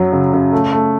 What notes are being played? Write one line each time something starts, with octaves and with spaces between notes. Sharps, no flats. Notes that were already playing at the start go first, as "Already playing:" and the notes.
Already playing: F#2 F#3
C#3
C#3
A3
A3